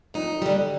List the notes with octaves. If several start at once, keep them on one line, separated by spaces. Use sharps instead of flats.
F2 D#4
D3 G3